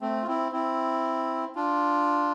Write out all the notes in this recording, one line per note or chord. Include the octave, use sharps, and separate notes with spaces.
A3 C4
F4
C4 E4
C4 E4
D4 F4